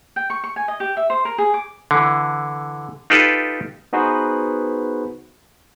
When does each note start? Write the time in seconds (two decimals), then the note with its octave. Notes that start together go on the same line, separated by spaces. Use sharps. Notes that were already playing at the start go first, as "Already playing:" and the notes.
0.16 G5
0.30 C#6
0.44 C#6
0.56 G#5
0.68 D#5
0.80 G4
0.97 E5
1.10 C5
1.25 A#4
1.38 G#4
1.54 D6
1.91 D3 E3
3.10 D#4 F4 G4 A4 B4
3.93 B3 D#4 F#4 G#4 B4 C5